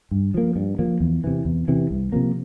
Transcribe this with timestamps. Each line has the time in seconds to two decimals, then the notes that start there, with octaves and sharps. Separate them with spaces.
0.11 G2
0.34 F3 A#3
0.56 G2
0.79 F3 A#3
1.00 E2
1.24 C3 E3
1.45 E2
1.68 C3 E3
1.91 C2
2.12 C3 F3 A#3